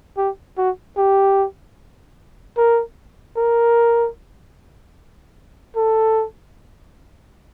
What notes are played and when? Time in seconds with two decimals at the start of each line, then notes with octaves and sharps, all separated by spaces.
0.18 G4
0.58 F#4
0.98 G4
2.57 A#4
3.37 A#4
5.76 A4